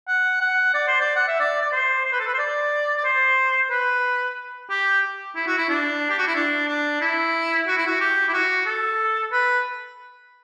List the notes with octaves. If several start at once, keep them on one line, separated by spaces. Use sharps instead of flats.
F#5
F#5
D5
C5
D5
F#5
E5
D5
D5
C5
C5
B4
A4
B4
C5
D5
D5
C5
B4
G4
E4
F#4
E4
D4
G4
F#4
E4
D4
D4
E4
F#4
E4
F#4
G4
E4
F#4
A4
B4